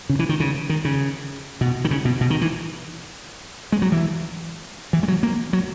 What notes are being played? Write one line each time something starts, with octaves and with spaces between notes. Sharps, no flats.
C#3
E3
D#3
C#3
D#3
C#3
B2
D#3
C#3
B2
B2
D#3
E3
G#3
F#3
E3
E3
G#3
F#3
A#3
F#3